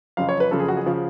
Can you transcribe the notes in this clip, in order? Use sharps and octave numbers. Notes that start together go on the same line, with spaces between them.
F#1 F2 C#3 F5
C#5
B4
F#1 F2 C#3 A4
G#4
F#4
G#4
C#3 F3